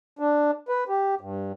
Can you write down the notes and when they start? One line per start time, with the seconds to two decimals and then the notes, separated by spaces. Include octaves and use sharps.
0.19 D4
0.69 B4
0.89 G4
1.21 G2